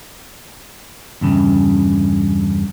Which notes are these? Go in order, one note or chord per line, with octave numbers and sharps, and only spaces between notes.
E2 G2 C#3